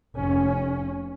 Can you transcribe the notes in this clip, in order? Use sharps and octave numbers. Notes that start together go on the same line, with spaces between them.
F1 C#4